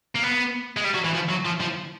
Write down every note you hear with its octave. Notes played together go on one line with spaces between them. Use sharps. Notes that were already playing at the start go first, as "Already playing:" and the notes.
A#3
B3
G#3
G3
F#3
E3
F3
F#3
F3
F3